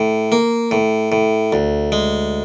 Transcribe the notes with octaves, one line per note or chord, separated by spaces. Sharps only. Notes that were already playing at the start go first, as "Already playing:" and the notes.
Already playing: A2
A#3
A2
A2
D2
G#3